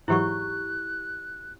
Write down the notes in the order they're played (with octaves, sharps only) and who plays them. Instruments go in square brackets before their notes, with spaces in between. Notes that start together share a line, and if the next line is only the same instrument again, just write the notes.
[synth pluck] G#2 E3 F#3 [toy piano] E4 G4 C#6 [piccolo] F#6